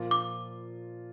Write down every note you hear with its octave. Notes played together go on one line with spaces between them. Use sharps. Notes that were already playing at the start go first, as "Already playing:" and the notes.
Already playing: A#2 F3 A#3 F4
D6